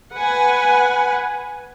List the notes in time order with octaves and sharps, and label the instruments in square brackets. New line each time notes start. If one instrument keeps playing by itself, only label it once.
[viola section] B4 F#5 G#5